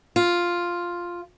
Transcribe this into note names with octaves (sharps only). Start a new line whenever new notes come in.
F4